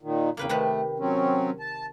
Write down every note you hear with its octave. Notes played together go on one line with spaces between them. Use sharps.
A#2 D#3
E2 C#3 A#3 B4 G5
C3 D#3 A3 B4
F#3 C4 C#4
A5